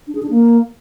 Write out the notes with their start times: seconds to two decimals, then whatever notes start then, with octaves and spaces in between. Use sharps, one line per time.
0.07 D4
0.15 G#4
0.23 D4
0.30 A#3